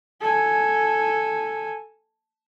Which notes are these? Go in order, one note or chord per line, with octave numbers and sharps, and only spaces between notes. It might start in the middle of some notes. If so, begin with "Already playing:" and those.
A4 G#5